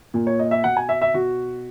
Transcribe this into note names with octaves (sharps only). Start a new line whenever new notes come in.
A#2
C#5
D#5
E5
B2 F#5
G#5
E5
E5
B2 F#4